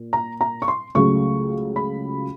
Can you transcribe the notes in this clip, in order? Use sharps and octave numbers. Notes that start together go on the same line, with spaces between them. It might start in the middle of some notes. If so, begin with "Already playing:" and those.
Already playing: A#2
A#5
A#5
C#6
C6
C#2 C#3 F#3 A3 C#6
B5